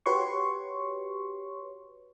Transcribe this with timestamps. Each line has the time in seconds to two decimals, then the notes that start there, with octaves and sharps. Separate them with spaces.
0.06 F#4 G4 B4 C#5 C6 C#6